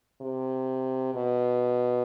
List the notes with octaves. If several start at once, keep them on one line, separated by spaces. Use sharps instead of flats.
C3
B2